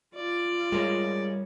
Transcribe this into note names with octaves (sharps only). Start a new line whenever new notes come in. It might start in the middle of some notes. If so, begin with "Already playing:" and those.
F4 D5
G3 G#3 A#4 C#5